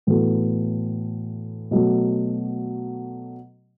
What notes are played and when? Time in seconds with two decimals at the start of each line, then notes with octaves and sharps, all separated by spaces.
0.07 A2 E3 B3 F#4 A4
1.71 B2 F#3 A3